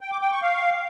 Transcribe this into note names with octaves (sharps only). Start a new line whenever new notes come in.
G5
D6
G5
C#6
F5